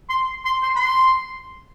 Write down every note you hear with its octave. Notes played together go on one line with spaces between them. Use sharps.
C6
C6
C6
B5
C6